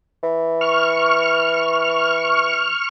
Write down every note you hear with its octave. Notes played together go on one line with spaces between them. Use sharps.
E3
C#6 F6